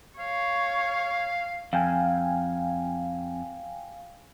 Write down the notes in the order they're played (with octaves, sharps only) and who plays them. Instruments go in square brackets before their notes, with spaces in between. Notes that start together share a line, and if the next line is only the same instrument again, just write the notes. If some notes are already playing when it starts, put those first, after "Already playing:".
[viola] C#5 [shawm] F5
[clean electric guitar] F2 [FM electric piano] F5 G5 G#5